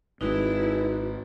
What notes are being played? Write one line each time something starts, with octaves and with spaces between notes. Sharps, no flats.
G#1 G#3 D#4 E4 F#4 G#4 B4